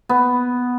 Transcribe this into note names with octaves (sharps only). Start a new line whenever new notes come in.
B3